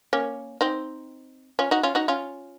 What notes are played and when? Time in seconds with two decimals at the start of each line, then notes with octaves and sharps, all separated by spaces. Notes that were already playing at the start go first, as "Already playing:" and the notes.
0.13 A#3 C#4
0.61 C4 D#4
1.59 C#4 F4
1.71 D#4 F#4
1.83 C#4 F4
1.95 D#4 F#4
2.08 C#4 F4